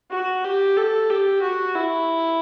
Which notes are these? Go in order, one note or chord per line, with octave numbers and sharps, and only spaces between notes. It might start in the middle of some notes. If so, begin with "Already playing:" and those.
F#4
G4
A4
G4
F#4
E4